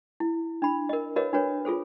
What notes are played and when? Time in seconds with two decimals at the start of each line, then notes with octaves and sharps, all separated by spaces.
0.20 E4
0.62 D4 B5
0.89 A#4 D#5
1.16 F#4 A#4 B4 C#5 D#5 F5
1.33 D4 F#4 B4 C#5
1.65 F4 G#4 A4 C5